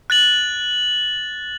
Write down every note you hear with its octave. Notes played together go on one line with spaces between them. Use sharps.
F#6 A6 F#7